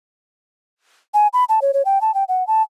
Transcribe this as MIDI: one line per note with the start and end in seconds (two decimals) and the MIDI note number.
1.14 1.27 80
1.33 1.44 83
1.49 1.60 81
1.62 1.72 73
1.74 1.82 73
1.85 2.01 79
2.01 2.14 81
2.14 2.24 79
2.29 2.46 78
2.47 2.62 81